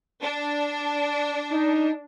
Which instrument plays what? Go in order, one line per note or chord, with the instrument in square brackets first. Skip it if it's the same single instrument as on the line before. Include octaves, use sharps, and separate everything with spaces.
[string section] D4
[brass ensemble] D#4